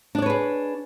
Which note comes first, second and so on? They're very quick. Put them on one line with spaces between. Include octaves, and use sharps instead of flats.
D4 D5 C#5 B4 G#4